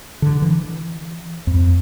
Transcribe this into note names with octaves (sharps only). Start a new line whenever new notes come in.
D3
E3
F2